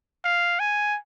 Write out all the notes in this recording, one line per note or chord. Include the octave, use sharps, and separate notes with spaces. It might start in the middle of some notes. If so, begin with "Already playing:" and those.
F5
G#5